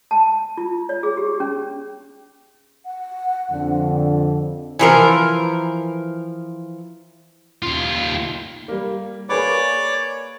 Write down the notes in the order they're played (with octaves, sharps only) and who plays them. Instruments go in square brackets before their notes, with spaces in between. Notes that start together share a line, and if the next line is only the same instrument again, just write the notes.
[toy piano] A5
F4
C#5
G#4
G4
C#4
[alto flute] F#5
[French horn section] F2 D3
[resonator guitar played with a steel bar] E3 F3 A#4
[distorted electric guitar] D#2 F4
[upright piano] G3 A#3
[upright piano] A#3 G#4 B4 [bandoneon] C#5 D5 D6